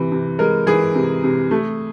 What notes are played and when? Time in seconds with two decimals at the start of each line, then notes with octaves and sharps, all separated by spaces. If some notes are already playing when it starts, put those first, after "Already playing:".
Already playing: C3 E3
0.12 C3
0.39 G#3 A#4
0.67 E3 G#4
0.95 C3
1.23 C3
1.51 A3